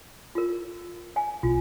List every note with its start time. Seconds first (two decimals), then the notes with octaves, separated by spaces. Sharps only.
0.35 F4 A#4
1.16 F5 G#5
1.43 B1 F4